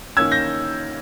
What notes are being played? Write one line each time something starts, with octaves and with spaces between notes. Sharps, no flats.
D#3 A#3 C#4 E6 G#6
G6 A#6